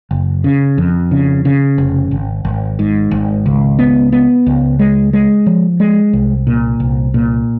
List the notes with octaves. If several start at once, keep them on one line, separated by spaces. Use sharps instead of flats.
F#1
C#3
F2
C#3
C#3
F1
G#1
G#1
G#2
G#1
C#2
B3
B3
C#2
G#3
G#3
F3
G#3
C2
A#2
C2
A#2